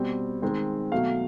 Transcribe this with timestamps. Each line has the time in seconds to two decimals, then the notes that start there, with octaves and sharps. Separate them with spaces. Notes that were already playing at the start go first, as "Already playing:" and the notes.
Already playing: B2 G3 C4
0.42 D#3 G#3 C4
0.92 B2 F#3 A3 F5